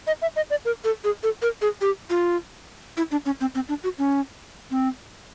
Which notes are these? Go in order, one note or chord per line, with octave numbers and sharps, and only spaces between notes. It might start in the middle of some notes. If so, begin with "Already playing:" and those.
D#5
E5
D#5
D5
A#4
A4
G#4
A4
A#4
G#4
G4
F4
E4
D4
C#4
C4
C4
D4
F#4
C#4
C4